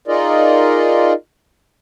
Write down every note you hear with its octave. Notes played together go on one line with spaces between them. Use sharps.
D#4 F4 G#4 A#4 D5 D#5